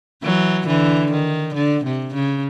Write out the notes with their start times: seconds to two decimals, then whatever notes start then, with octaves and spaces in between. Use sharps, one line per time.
0.23 E3 F#3
0.67 D3 E3
1.11 D#3
1.55 D3
1.84 C3
2.15 C#3